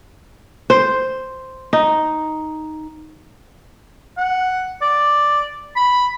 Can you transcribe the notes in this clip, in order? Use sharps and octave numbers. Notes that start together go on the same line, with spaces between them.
C5
D#4
F#5
D5
B5